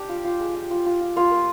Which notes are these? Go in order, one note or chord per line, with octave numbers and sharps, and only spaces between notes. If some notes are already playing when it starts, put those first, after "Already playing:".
Already playing: D4 G4
F4
F4
G#3
F4
F4
F4
F4
A#3 F4
A#3